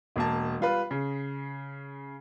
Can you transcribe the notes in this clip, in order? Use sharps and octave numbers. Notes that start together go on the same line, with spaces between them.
E1 A#3 A5
G3 F4 B4
C#3